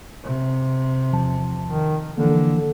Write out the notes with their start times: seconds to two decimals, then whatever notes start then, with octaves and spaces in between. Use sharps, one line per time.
0.24 C3
1.12 E2 F3 A5
1.65 D#3
2.18 D3 E3 F3 A#3